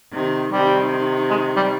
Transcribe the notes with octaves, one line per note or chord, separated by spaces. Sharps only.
C3 D#3
C3 D#3 G3
G#3
G3